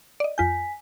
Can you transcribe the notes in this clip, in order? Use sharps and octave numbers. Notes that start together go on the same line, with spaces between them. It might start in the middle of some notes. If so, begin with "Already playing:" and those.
D5 D#5
F2 F4 G#5 G6 B6